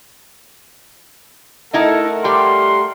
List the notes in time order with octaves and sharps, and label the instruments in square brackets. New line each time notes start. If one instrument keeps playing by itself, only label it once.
[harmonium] A3 A#4 F#5 [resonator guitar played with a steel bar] D#4 E4 D#5 [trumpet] A4
[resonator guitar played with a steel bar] G3 G4 G5 [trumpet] C6